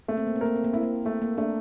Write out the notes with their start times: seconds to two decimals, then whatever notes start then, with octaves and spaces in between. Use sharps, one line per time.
0.08 A3 A#3
0.17 C4
0.27 A#3
0.36 C4
0.41 A#3 A#4
0.56 C4
0.64 A#3
0.73 C4 E4
0.83 A#3
1.05 A3 A#3
1.22 A#3
1.38 A3 D4